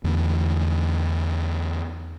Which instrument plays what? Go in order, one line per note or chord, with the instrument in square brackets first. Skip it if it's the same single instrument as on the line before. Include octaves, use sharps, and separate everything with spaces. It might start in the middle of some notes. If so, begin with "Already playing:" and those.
[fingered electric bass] E2 D3 A3